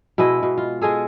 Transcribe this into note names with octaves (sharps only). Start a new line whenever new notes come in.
B2 G#3 E4 D#5
B2
F4
G#3 F4 G#4 A4